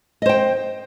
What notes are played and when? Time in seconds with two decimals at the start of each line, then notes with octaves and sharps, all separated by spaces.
0.22 D#5
0.26 C5
0.29 G5